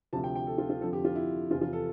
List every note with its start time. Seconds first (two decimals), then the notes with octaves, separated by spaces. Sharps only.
0.13 D2 C3 F3 A5
0.24 G5
0.36 G5
0.47 A4
0.58 F4
0.69 F4
0.81 F2 D3 F3 A4
0.93 G4
1.05 F4
1.16 E4
1.51 E2 C3 F3 F4
1.61 F4
1.73 A4